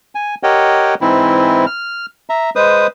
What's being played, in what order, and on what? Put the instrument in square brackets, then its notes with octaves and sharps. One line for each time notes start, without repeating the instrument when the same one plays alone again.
[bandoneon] G#5
G4 A#4 C#5 D#5 F#5 G5
G#2 E3 C4 E4
F6
E5 A#5
G#3 B4 C5 D#6